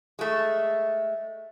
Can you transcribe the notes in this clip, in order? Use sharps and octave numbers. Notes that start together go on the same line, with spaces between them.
G#3 A3